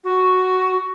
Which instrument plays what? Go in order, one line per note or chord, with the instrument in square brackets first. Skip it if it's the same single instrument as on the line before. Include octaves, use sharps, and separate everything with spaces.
[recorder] F#4